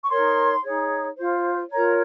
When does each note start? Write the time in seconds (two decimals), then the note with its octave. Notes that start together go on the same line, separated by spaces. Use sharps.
0.03 C#6
0.08 D#4 A#4 C#5 C6
0.63 D#4 G#4 C#5
1.17 F4 C5
1.71 F4 A#4 C#5 A#5